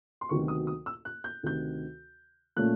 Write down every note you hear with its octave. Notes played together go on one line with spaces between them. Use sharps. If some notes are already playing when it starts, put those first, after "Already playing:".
C6
D2 C3 D#3 F#3 B3 C#6
D#6
D#6
E6
F#6
G6
D2 C3 D#3 G6
A#2 F3 A3 C#4 F#6